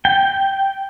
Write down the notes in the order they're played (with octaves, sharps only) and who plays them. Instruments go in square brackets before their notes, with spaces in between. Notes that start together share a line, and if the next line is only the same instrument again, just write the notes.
[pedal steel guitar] G5